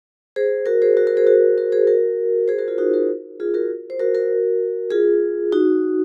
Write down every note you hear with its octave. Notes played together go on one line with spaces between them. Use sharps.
G#4 C5
F#4 A#4
G#4 C5
F#4 A#4
F#4 A#4
G#4 C5
F#4 A#4
F#4 A#4
G#4 C5
F#4 A#4
G#4 C5
F#4 A#4
F4 G#4
D#4 F#4
F#4 A#4
F4 G#4
F#4 A#4
C5
F#4 A#4
F#4 A#4
F4 G#4
D#4 F#4